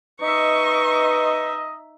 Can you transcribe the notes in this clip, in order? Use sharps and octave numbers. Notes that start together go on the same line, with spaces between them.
D#4 B4 D#5 E5 C#6